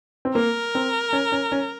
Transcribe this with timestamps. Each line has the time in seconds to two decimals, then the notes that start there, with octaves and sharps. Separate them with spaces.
0.25 C4
0.35 A#3 A#4
0.75 C4
1.13 C#4
1.32 C#4
1.52 C#4